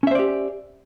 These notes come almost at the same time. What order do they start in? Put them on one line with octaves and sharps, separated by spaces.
C#4 E5 C5 D5 G4